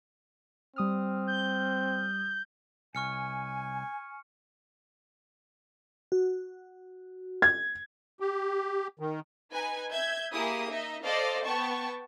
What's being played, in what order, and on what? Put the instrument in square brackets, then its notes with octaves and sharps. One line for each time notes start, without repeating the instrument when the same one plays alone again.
[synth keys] G3 D#6 F6 [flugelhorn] C4
[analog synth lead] G6
[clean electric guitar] C2 [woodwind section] G#5 [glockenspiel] C#6 F6 C#7
[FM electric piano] F#4
[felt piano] G#6
[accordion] G4
D#3
[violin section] D#4 B4 G#5
E5 G6 G#6
A#3 E4 G4 G#4 D#6
D#4 D#5 E5
A4 C5 D5 D#5 F5
B3 G5 A5 C#6